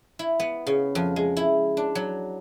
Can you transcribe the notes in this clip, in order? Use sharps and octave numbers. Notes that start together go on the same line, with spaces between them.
E4
B3
C#3
F2
G#3
E4
D4
F#3